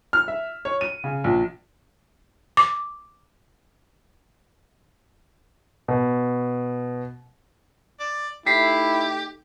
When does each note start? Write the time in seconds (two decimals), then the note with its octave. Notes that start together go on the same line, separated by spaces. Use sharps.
0.13 F6
0.28 E5
0.65 C#5
0.81 D#7
1.04 C#3
1.24 A#1
2.57 D6
5.88 B2
8.00 D5
8.46 A3 D#4 E4 G4 B6 C7